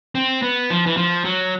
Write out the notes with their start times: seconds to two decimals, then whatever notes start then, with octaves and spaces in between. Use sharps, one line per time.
0.15 C4
0.42 B3
0.70 F3
0.86 E3
0.97 F3
1.25 F#3